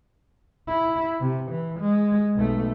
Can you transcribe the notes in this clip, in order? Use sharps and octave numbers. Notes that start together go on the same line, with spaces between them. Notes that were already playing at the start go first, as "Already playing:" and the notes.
E4
C3
E3
G#3
B1 A3